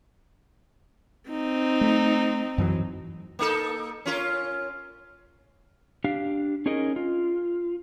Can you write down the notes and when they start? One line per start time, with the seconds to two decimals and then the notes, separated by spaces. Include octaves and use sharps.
1.30 C4 D#4
1.81 A3
2.58 F#2 E3 F#3
3.39 A#3 D#4 A4
4.05 C#4 F4 A#4
6.04 D4 G4 F5
6.66 C#4 D#4 G#4 A#4 D#5
6.96 F4